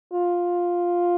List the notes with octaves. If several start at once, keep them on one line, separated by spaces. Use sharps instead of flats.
F4